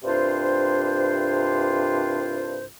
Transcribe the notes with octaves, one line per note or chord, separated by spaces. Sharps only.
C2 G2 C3 D4 F4 C5